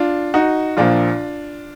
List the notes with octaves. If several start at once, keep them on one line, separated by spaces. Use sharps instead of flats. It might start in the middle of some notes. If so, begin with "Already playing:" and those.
Already playing: D4 F4
D#4 F#4
A#1 A#2 F3 A#3 D4 F4